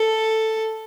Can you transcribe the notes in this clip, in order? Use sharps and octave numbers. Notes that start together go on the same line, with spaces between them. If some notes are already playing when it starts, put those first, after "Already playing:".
Already playing: A4